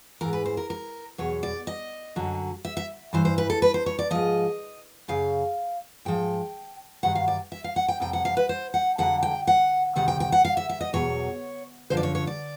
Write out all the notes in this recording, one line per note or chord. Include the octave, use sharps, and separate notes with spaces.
G#2 E3 A#4
B4
C5
A#4
A#4
E2 B2 F#3 C#5
D5
D#5
F#2 D3 F#3
E5
E5
G2 E3 C5
C5
B4
A4
B4
C5
C#5
D5
G#2 F3 D#5
F#2 C#3 F5
G#2 F3 G5
G2 D#3 F#3 F#5
F5
D5
E5
F5
F#5
G5
F2 C3 G5
F#5
F5
B4
C5
F#5
F2 D3 F#3 F#5
G5
F#5
D2 C3 D#3 F#5
G5
G5
F#5
F5
E5
E5
D#5
E2 B2 F#3 C#5
F#2 D3 F3 C5
D5
C#5
C#5
D5